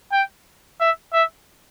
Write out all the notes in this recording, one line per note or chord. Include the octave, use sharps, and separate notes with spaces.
G5
E5
E5